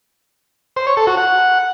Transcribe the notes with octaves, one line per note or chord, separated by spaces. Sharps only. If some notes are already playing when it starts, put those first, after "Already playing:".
C5
C#5
A4
F#4
F#5